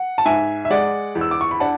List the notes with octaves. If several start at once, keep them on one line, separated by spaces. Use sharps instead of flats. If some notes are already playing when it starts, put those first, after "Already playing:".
Already playing: F#5
A5
G#2 E5 G#5
E5
G#3 D5 F#5
E2
E6
D6
C#6
B5
D4 F#5 A5